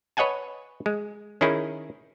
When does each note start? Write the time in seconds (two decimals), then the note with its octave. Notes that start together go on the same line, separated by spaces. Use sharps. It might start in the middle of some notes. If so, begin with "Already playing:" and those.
0.17 B4 C#5 D#5 F#5 G#5 A5
0.86 G#3
1.41 D#3 C#4 D#4 E4 G#4